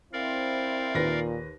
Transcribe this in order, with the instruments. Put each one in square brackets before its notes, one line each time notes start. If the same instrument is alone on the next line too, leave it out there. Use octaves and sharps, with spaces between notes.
[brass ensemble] C4 E4 C5 [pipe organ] A#4 D5 F5
[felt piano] D#2 B4 A#6 [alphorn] A#2